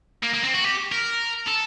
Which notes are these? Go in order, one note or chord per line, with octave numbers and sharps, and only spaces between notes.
A#3
A#3
C4
F#4
G4
A#4
A4